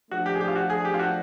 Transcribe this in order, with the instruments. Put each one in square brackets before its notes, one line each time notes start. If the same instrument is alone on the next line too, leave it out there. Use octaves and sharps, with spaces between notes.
[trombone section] F3 A3 D4 [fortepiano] F#4
[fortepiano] G4
G#4
G4
F4
F#4
G#4
G4
F4
F#4